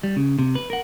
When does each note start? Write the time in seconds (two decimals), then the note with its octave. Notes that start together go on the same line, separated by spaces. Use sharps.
0.03 G3
0.16 C#3
0.39 C3
0.55 B4
0.70 A#4 F#5